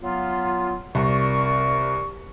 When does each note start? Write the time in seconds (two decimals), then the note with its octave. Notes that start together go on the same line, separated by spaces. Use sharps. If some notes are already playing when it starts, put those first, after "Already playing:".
0.01 F#3 B3 F4
0.95 C2 A#4 D5 C#6